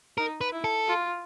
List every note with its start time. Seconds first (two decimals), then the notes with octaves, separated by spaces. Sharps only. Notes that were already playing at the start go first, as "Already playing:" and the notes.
0.18 D#4 A#4
0.41 B4
0.52 E4
0.64 A4
0.87 F4